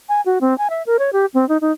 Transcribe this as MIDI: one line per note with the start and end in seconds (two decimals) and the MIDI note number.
0.09 0.21 80
0.26 0.38 66
0.41 0.56 60
0.58 0.67 80
0.70 0.82 76
0.86 0.97 70
0.99 1.10 73
1.13 1.26 67
1.34 1.47 60
1.49 1.57 63
1.61 1.72 63